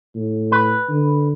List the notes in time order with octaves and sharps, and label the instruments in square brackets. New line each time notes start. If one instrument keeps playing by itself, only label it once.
[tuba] A2
[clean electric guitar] B4
[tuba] D3